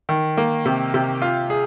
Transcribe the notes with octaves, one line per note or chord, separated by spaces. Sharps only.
D#3
A#3
C3
C3
F4
G#4